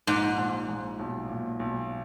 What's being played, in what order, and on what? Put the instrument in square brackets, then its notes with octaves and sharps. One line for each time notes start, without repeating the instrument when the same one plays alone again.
[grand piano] A#1 [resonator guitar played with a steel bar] G#2
[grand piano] A#1
A#1
B1
A#2
B1